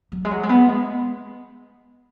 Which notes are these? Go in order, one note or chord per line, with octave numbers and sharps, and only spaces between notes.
F#3
G#3
F#3
G#3
B3
G#3